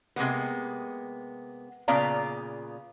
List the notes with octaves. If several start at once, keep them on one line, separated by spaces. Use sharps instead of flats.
C3 G#3 A#3 B3
A#2 C#3 B3 D5 F5 A#5